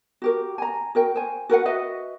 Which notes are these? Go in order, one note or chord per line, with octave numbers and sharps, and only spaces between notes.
F#4 G4 A#4
G#5 A#5
F#4 A#4 G5
C5 G#5
F#4 A#4 B4 F#5
F#4 B4 D#5 E5